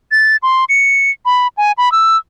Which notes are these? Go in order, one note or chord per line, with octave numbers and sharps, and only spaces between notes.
A6
C6
C#7
B5
G#5
B5
E6